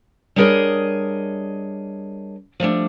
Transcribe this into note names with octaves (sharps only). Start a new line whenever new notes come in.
G3 D4 G#4 A#4 C#5 D#5
F3 G3 A3 D4